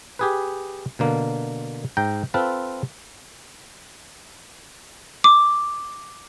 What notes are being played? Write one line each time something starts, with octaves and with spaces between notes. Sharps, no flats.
G4 G#4 B4
B2 D3 A#3
G#2 G5 A#5
C4 F4 A4 B4
D6